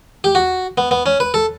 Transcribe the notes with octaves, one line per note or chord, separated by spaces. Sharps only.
G4
F#4
B3
B3
C#4
B4
A4